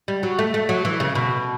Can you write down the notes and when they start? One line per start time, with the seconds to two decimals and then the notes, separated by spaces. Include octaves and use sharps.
0.08 G3
0.23 F#3
0.39 A3
0.54 A3
0.69 F#3
0.85 E3
1.00 C#3
1.15 B2